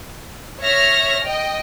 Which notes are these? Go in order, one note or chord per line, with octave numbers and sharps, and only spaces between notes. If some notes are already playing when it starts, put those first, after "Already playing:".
C#5 E5 F6 A#6
D#5 G5